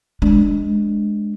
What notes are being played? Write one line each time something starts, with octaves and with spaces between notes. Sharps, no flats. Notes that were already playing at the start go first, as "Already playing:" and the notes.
G#3 D4